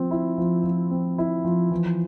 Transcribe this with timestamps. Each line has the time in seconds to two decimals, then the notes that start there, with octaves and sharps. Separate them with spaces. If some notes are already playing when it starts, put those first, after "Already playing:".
Already playing: F3 C4
0.11 E4
0.38 F3
0.64 F3
0.91 C4
1.18 E4
1.44 F3
1.71 E3